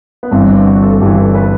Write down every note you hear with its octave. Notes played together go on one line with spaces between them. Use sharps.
B3
G1 G2 E3 C4
D4
F#4
A4
A4
G1 G2 E3 G4
A4
B4